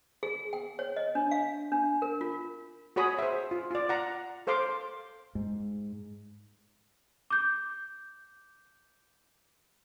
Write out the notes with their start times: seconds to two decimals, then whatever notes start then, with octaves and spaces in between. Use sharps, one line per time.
0.23 G#4
0.53 G5
0.79 C#5
0.96 D#5
1.15 D4
1.31 F5
1.72 D4
2.02 A#4
2.21 F4
2.96 F#4 G#4 C#5 B5 D#6
3.19 C5 E5
3.51 F4
3.71 F4 D5
3.89 F#5 A#5
4.47 A4 C5 F5 C6 D6
5.35 G#2
7.30 D6 G6